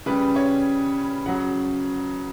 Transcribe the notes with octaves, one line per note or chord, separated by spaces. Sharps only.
C#3 G3 B4
C#5
C#3 F#3 F#5